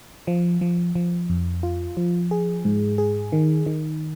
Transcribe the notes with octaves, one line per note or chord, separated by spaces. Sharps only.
F3
F3
F3
F2
F4
F3
G#4
G#2
G#4
D#3
D#3